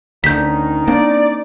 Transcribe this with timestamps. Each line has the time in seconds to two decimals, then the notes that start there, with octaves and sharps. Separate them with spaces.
0.24 D2 D3 D#3 C#4 D#4 G6 B6
0.88 A#3 C4 D4 D5